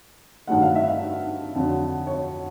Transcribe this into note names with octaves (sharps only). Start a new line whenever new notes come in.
G2 D#3 F#3 A3 F#5
F5
E5
F5
F2 D3 F#3
C#5